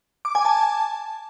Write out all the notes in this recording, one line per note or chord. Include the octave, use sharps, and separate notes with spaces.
D6
G#5
A5